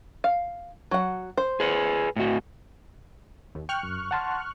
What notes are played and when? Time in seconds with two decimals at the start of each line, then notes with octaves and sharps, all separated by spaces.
0.24 F5
0.91 F#3 F#5
1.37 C5
1.60 G#4 B4
2.16 A2 F#4
3.55 D#2
3.69 G5 C#6 F6 F#6
3.83 F#2
4.11 F#5 A5 C6